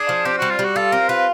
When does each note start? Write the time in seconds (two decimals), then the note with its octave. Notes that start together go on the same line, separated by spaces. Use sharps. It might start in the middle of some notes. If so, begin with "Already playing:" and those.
Already playing: D4 G#4
0.09 F3
0.25 C4 G4
0.38 G3 F#4
0.50 F4
0.59 G3 F#4
0.76 F4 A4
0.92 C4 A#4
1.09 F4 B4